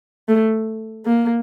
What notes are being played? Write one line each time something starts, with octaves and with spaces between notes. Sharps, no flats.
A3
A#3